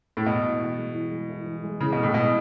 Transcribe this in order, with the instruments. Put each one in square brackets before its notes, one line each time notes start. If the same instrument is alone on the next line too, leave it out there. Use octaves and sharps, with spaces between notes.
[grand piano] A2
[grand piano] B2 [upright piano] E3
[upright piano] G#3
E3
G#3
E3
G#3
E4
E3
G#3
[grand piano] C#3 [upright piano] E3
[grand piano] B2
[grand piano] A2 [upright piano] G#3
[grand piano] B2 [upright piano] G#3